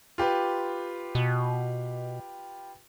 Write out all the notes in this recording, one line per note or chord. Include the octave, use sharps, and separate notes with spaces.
F4 G4 B4
B2